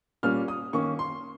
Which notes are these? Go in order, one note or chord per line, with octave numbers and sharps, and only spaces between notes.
A#2 G3 A#3 C#4 F6
D#6
D#3 A#3 C#4 C#6
C6